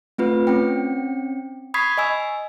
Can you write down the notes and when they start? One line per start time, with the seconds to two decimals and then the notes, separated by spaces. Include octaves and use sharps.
0.18 A3 C4 F4 B4
0.47 C4 C#4 G5
1.74 B5 C#6 D#6 G#6 B6 C7
1.98 D#5 G#5 E6